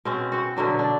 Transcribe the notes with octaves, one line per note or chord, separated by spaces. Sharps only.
B2 C4 C#4
C4 F#4
B2 D3 F#3 D4
D4